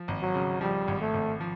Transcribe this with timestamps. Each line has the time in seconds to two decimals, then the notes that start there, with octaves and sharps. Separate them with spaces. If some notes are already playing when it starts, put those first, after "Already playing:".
Already playing: F3
0.08 G#1
0.22 F#3
0.34 C#3
0.61 F3 G3
0.88 G#1
1.01 A3
1.14 G#1
1.40 F3